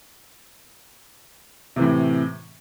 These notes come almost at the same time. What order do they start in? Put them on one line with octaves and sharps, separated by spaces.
C3 E3 A2